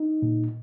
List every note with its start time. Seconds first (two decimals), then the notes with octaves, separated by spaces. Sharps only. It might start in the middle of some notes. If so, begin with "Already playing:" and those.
Already playing: D#4
0.22 A#2